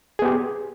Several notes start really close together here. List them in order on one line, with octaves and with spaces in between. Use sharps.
G#4 B3 G4